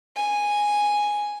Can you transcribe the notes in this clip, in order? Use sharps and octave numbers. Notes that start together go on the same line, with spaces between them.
G#5